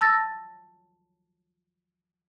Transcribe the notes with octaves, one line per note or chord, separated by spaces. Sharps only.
A5 E6 A6 A#6